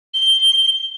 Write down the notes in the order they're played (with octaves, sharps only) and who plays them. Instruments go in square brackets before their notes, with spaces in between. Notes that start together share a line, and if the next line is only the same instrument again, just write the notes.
[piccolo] G7